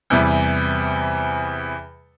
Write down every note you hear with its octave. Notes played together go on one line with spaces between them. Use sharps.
E2 C3 E3 G3